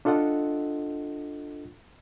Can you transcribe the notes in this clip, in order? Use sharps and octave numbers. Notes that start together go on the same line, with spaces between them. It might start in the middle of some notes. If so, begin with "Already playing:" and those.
D4 F4 A4 D#5 F#5